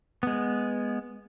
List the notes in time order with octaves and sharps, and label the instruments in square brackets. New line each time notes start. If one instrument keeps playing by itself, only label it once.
[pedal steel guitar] G#3 B3